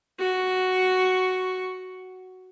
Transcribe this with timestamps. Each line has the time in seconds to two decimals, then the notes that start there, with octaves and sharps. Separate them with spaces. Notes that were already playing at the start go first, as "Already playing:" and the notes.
0.19 F#4 C#6